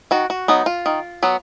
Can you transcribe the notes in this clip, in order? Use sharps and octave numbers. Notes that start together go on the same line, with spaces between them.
D#3 F#4
F#4
F#3 B3 D#4
F4
D#3
F#3 B3